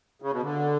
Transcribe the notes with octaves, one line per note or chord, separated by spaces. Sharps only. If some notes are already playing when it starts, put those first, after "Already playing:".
C#3
B2
D3